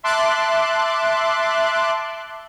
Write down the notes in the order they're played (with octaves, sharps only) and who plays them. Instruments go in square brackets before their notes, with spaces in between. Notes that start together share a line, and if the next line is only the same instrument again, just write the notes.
[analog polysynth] E5 A5 C6 D6 F#6